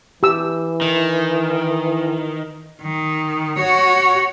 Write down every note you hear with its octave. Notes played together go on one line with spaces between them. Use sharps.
E3 G4 E6
D#3
D#3
F#4 C#5